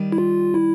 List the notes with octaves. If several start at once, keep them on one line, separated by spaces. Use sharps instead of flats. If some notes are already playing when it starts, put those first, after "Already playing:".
Already playing: D#3 G3
E4
F4
E4